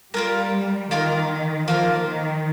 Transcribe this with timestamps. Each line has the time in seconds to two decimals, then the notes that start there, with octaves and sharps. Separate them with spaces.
0.14 G3 A#3 F4 A#4
0.91 D#3 A#3 F4 A#4
1.68 F3 A#3 F4 A#4
2.06 D#3